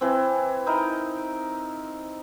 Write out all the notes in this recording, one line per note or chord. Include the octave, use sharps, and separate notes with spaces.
E3 C4
D#4 E4 A#4 D#5